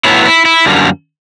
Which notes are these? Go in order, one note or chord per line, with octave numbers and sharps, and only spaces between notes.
A2 F#3 B3 E4
E4
E4
F#2 D3 G3 A#3